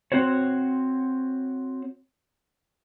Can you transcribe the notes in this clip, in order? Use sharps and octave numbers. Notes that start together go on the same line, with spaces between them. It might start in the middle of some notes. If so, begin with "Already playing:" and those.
C4 F#4 C5 C#5